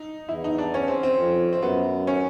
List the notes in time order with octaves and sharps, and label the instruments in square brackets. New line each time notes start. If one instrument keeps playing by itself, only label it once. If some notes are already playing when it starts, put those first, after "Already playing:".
Already playing: [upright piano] D#4
[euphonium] E2 [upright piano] E4
[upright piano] D#4
D4
C#4
C4
C4
[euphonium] F2
[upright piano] C4
[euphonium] F#2 [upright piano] B3
[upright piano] C#4